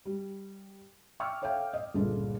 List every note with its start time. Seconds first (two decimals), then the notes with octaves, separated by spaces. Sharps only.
0.06 G3
1.20 G5 C#6 D6 E6 F6
1.42 A4 C#5 E5 F5 G5
1.74 D#5
1.94 G1 C#2 A#2 G#3 D4 A4